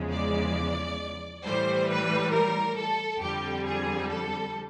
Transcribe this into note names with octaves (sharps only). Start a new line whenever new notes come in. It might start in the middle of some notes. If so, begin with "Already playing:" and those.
Already playing: E2 C#3 F3 G#3
D5
A2 E3 G3 C5
B4
A#4
A4
F2 D3 G3 G4
G#4
A4